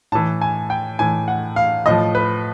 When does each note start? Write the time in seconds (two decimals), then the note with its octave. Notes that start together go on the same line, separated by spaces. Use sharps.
0.12 A2 E3 A5
0.41 G#5
0.70 G5
0.99 A2 E3 G#5
1.28 F#5
1.56 F5
1.86 A2 F3 D#5
2.15 B4